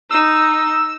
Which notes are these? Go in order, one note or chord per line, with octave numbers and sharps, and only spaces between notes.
D#4 E6